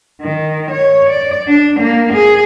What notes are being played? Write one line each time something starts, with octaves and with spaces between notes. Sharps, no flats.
D#3
C#5
D5
D4
A#3
G#4